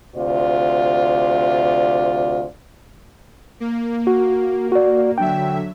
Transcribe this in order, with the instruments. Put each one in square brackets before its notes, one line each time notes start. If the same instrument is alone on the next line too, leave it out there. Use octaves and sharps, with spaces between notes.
[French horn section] D2 C3 F4 D5
[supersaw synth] A#3
[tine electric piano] F#4
F#4 D5
[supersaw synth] D3 F#3 E5 [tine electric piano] G5